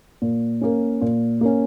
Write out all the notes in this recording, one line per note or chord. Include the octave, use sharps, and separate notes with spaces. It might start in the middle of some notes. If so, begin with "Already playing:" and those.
A#2
A#3 C#4
A#2
A#3 C#4